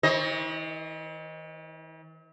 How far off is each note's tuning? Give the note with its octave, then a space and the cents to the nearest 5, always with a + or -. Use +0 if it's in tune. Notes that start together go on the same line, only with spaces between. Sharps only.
E3 -45 C5 +35 D#5 +0